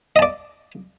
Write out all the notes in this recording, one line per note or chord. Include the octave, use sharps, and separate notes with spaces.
D5 D#5 A5